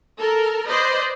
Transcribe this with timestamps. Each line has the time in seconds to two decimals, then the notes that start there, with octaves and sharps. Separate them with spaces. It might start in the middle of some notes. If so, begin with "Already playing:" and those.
0.19 A4 A#4
0.68 B4 C5 D5 D#5